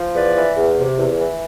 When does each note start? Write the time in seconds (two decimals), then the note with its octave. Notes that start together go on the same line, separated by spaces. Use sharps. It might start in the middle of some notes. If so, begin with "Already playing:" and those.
Already playing: F3
0.14 E2 B4 D5
0.35 E3
0.55 E2
0.76 C3
0.97 E2
1.17 E3